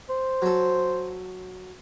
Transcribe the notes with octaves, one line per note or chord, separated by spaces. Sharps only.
C5
F#3 A4